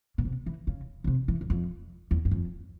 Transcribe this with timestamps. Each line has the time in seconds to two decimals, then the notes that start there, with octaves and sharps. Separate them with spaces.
0.18 A#2
0.25 C3
0.46 E3
0.67 C#3
1.04 C#3
1.07 C3
1.28 E3
1.41 E2
1.50 F2
2.11 E2
2.25 G2
2.31 F2